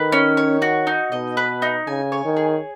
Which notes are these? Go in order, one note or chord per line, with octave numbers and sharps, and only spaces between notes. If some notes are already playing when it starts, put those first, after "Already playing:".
Already playing: D#3 B4
C#4
C#5
F#4
D#4
B2 D#5
B4
D#4
C#3 G#5
C#5
D#3
G#4